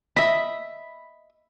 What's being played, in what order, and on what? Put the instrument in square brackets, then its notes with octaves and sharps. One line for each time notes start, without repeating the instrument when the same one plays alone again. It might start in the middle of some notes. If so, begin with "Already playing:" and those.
[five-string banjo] D#5 E5 [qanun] B5